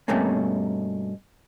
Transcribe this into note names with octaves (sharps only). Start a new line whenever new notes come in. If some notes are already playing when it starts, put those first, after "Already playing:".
G2 B2 A3 A#3 C4 C#4